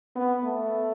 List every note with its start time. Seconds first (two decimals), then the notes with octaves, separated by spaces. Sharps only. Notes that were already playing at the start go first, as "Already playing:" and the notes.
0.15 B3
0.44 A3